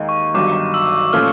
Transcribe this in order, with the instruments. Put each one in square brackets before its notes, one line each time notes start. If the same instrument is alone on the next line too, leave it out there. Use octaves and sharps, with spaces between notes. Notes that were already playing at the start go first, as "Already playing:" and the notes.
Already playing: [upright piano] D#2 D#3 G#3
[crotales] C#6
[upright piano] G1 G2 D#3 F#3 [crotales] D6
[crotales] E6
[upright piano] A#2 F3 A3 C#4 F4 [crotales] F6